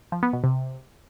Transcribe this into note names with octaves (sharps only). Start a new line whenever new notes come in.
F3
B3
B2
C3